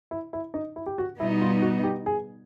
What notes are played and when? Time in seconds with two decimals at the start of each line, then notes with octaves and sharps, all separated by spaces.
0.11 E4
0.33 E4
0.54 D#4
0.76 E4
0.86 G4
0.98 F#4
1.19 B2 G3 B3 D#4 E4
1.42 F4
1.62 F#4
1.84 G4
2.06 G#4